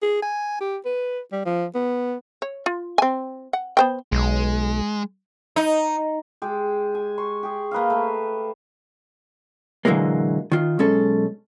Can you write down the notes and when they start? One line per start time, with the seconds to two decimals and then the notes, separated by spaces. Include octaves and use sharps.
0.02 G#4
0.22 G#5
0.61 G4
0.85 B4
1.32 G3
1.46 F3
1.75 B3
2.42 C#5
2.66 F4
2.98 C4 G#5
3.53 F#5
3.77 B3 C5 G5
4.12 B1 G#3
5.56 D#4
6.42 G#3 G4
6.95 G#5
7.18 C6 C#6
7.43 G4 G#4
7.71 A#3 B4 D#5 F5
7.90 A3
9.85 A#2 D3 E3 F#3 G#3 A#3
10.52 D#3 F4
10.79 B1 G#3 C#4 A4